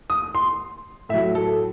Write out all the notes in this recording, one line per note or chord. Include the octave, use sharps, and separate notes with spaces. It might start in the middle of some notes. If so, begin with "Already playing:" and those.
D#6
C6
A2 F#3 E5
A4